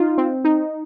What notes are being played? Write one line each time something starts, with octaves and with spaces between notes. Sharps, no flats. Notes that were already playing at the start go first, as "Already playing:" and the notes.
Already playing: D#4 F4
C4
D#4